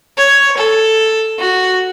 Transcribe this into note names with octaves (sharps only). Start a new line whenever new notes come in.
C#5
A4
F#4